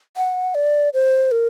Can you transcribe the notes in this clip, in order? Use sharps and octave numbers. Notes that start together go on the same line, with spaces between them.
F#5
D5
C5
A#4